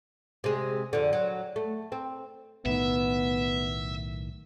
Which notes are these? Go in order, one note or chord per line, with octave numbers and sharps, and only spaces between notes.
C3 G#3
F2 D3
F#3
A3
C4
B1 A2 D#3 B3 E5